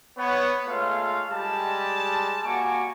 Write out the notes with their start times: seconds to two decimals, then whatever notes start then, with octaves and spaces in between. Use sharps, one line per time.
0.18 B3 C#5 F#5
0.68 G#3 A3 F4 C#5 F5
1.29 G3 G#3 A5
2.44 G3 A#3 F#4 G#5 C#6 D6